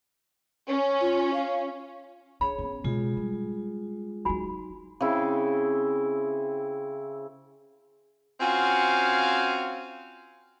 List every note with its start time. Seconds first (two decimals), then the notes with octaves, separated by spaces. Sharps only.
0.69 C#4
1.01 F4
1.34 F5
2.41 D4 G#4 C#5 B5
2.58 B3 C#4
2.84 B2 G#3 F4 G#4
3.17 G3
4.25 F#3 D#4 F#4 G#5 B5
5.01 C#3 C4 E4
8.41 C4 C#4 F4 F#4 F5 G#5